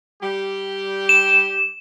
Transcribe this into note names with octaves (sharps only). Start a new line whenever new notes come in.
G3 G4
E7